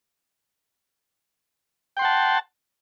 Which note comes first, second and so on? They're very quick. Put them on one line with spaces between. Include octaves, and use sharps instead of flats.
G5 C6 F#5 A5